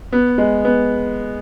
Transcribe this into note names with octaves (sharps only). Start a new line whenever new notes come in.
B3
G#3
B3